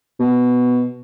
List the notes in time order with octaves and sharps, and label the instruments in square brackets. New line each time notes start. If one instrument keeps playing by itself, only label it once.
[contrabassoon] B2